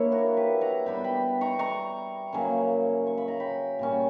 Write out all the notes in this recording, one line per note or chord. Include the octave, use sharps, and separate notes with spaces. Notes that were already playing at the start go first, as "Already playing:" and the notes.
Already playing: A#3 D4 E4 C#5
F#4 A#4
G4 B4
F#5 A#5
B2 G3 B3 D4 G5 B5
G5 B5
A#5 C#6
A#5 C#6
C#3 F#3 A#3 C#4
C#6
B5
A#5
G5 B5
A#2 G3 C#4